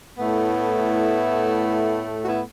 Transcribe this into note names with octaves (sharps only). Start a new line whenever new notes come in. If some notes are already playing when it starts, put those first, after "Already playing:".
A2 A3 B3 E4
F#4
B3 E4